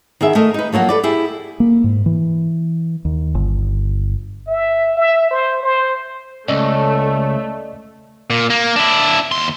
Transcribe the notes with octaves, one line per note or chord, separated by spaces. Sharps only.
D#3 B3 G#4 E5
A3 A#4 D#5
D#4 B4
F3 F#3 A#3 F#4
A4 B4 D5
E4 G4 G#4
A#3
G#2
E3
D#2
G1
E5
E5
C5
C5
C#2 A3 C#4 D5 D#5 E6
A#2
A#3
D4 E4
D#2 C6